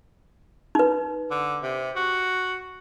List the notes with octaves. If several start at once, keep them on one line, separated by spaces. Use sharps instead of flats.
D#4 B4
D3
C3
F#4